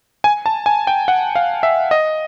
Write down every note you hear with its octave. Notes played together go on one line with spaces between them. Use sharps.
G#5
A5
G#5
G5
F#5
F5
E5
D#5